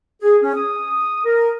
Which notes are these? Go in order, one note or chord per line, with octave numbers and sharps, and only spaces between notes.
G#4
C#4
D#6
A#4